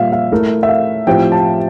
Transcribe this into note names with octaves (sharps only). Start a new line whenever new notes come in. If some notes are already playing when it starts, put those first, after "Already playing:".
Already playing: A#2 G3 F4 E5 F5
F5
A3 E4 A#4
E5
F5
A2 F3 C4 G4 G5
A5